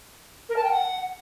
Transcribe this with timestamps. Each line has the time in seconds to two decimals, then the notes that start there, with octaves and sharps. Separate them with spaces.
0.49 A#4
0.56 A5
0.63 G5
0.70 F#5